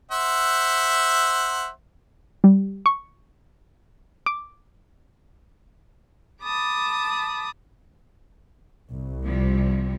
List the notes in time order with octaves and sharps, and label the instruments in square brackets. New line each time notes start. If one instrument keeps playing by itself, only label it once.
[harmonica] C5 E5 F#5
[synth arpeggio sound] G3
C#6
D6
[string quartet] A5 B5 D6 D#6
[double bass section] C2
[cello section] C3 F3 G3